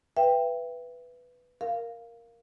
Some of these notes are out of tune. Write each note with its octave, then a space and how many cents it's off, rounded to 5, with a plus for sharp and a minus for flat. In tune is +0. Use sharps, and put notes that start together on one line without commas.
B4 +5 E5 +30 G5 +15
A#4 +0 F5 -5